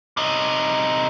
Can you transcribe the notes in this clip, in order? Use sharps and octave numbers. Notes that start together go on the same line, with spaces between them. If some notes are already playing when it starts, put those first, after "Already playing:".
C3 D#4